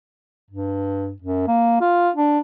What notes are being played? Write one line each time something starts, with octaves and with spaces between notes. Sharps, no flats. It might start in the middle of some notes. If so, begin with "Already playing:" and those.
G2
F#2
A#3
F4
D4